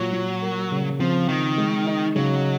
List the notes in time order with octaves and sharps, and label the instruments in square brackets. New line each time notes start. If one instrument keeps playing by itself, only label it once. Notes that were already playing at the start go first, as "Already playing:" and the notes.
Already playing: [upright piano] A#2 [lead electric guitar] F#3
[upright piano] A#2
A#4
C#3
[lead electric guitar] F3 [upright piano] C4
[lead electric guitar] D#3 [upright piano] F3
[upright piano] G#3
D#4
[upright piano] C#3 [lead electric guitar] F#3